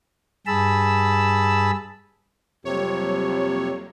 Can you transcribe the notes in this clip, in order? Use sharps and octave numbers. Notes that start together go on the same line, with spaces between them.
G2 G#4 A5 B5 E6
F2 C3 F#3 G3 A#3 C#5